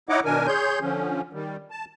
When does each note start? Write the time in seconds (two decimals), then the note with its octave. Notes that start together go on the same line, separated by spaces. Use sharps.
0.09 D#4 E4 C#5 D#5 F#5 D6
0.25 B2 D#3 D4 A#4 G#5
0.47 G#4 C#5 C6 G6
0.81 D3 F3 C#4
1.33 D#3 G3
1.71 A5